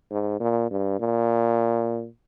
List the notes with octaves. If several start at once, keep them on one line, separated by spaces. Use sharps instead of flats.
G#2
A#2
G2
A#2